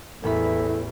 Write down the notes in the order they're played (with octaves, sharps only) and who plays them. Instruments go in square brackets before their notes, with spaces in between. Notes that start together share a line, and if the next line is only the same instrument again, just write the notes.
[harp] A1 B5 [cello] E2 [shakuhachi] E4 [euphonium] A4